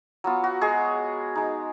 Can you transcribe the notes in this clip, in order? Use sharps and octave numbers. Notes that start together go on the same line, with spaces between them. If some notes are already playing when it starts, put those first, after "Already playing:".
F#3 B3 F4
F#4
G#3 G#4
G#3 D#4